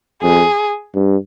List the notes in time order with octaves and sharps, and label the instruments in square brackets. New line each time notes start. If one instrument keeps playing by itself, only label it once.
[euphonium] F2 [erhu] G#4
[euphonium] G2